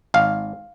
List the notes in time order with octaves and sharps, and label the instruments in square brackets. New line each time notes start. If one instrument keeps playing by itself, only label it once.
[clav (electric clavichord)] G#1 F5